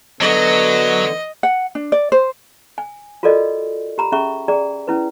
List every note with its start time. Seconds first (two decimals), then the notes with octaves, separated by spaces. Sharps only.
0.21 D3 F#3 B3 D#5
1.43 F#5
1.75 D4
1.92 D5
2.12 C5
2.78 G#5
3.23 F4 F#4 A4 A#4 D5 D#5
3.98 G4 A#5 B5
4.12 C#4 G#4 E5 A#5 C#6
4.48 G#4 D5 G5 A#5
4.87 C#4 E4 B4